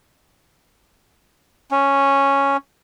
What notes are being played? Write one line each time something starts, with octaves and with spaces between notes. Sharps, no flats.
C#4